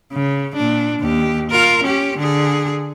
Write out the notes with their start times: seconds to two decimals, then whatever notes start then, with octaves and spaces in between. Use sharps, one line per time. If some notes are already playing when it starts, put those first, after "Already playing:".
0.13 C#3
0.55 A#2 D4
1.00 D#2 G4
1.50 F4 A#4
1.84 C#4 G4
2.18 D3 G#4